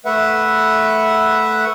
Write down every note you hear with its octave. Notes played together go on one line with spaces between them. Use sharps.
A3 B4 E5 F#5